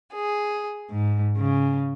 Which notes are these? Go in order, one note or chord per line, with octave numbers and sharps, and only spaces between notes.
G#4
G#2
C#3